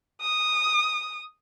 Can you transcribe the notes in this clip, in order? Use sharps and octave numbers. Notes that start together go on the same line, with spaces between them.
D#6